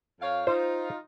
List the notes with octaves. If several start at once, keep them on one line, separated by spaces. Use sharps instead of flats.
F2 C#5 F5
D#4 F4 C5